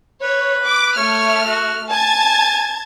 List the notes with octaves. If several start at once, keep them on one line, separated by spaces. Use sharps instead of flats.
B4 C#5
D6
A3 C#5 F6
F#4
G#5 A5 G#6 A6